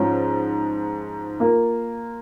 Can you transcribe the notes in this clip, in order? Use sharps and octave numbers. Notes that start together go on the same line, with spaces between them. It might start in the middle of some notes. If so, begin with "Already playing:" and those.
Already playing: G#2 F3 C#4
A#3 F4 A#4